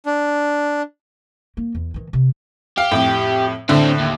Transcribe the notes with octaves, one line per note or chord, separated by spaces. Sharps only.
D4
A#3
E2
D#3 E3
C3
G4 F5
F2 A2
A2 D3 C4 D4
D#2